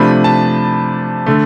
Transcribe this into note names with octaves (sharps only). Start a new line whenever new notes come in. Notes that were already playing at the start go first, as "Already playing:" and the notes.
Already playing: C3 F3 A3 D4 B5
A5
D3 A3